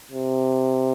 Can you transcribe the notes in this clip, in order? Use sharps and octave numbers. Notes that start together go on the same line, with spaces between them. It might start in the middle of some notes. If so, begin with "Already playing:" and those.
C3